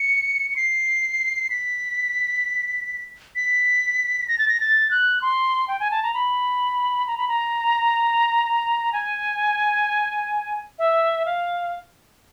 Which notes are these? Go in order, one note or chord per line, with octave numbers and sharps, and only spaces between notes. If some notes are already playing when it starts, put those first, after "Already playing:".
Already playing: C#7
C#7
C7
B6
B6
A#6
A6
A#6
A6
F#6
C6
G5
G#5
A5
A#5
B5
A#5
B5
A#5
G#5
E5
F5